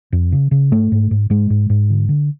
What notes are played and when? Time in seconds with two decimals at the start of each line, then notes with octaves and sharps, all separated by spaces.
0.12 F2
0.32 C#3
0.51 C#3
0.72 G#2 A3
0.92 G#2
1.11 G#2
1.30 G#2 G#3
1.50 G#2
1.70 G#2
1.90 D3
2.09 D3